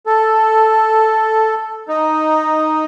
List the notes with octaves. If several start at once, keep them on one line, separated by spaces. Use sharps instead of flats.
A4
D#4